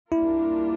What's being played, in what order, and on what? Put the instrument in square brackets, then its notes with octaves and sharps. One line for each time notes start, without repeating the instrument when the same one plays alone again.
[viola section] G3 A#3 D4 F4 A#4 [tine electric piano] E4